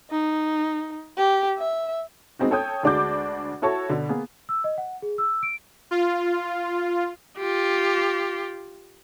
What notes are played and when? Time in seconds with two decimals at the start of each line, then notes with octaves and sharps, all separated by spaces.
0.11 D#4
1.17 G4
1.58 E5
2.39 G#3 B3 C4 D#4 F#4
2.51 A4 C#5 G5 D#6 G6
2.83 D2 G#3 D4 F#4 D6 G6
3.62 E4 F#4 A4 C#5 A5 C#6
3.89 B2 D3
4.09 A#3 B3 G#4
4.49 E6
4.64 D#5
4.78 F#5
5.02 G#4
5.18 E6
5.43 D7
5.91 F4
7.38 F4 G4